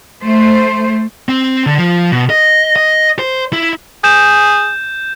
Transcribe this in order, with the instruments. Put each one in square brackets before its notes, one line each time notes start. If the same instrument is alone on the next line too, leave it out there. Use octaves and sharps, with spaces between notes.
[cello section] A3 C5
[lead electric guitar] C4
D3
F3
B2
D#5
D#5
C5
E4
[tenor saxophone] G#4 [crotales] G6 E7